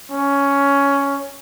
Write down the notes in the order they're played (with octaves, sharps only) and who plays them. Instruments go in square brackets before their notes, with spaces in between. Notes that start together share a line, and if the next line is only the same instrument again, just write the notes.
[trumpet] C#4